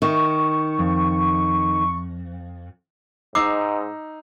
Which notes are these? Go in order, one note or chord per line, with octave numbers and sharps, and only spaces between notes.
D#3 C#6
F2
G#2 D#4 D6 E6 C7